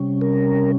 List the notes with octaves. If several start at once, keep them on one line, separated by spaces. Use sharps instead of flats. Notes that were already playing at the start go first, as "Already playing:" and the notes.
Already playing: C3 G3 C#4
A#4